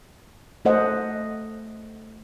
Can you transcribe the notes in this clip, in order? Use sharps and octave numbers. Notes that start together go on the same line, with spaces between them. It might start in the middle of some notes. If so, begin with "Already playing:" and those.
A3 A4 C5 D#5 F#5